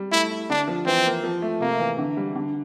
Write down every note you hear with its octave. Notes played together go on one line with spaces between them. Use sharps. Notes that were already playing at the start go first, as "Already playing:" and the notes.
Already playing: G3
A3 E4
E4
D3 D4
F3
E3 C4
A#3
F3
A3
C3 A#3
E3
D3
G3
D3